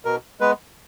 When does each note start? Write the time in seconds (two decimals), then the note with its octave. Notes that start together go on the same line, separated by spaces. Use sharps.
0.05 B2 A#4
0.40 G#3 B3 B4